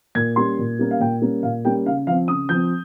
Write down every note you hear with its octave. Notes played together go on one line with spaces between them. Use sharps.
A#2 G#6
G3 A#3 C#4 C6
A#2
G3 A#3 C#4
F5
A#2 G5
G3 A#3 C#4
A#2 F5
G3 A#3 C#4 G5
C#3 F5
F3 C4 F5
C#3 D#6
F3 G6
C4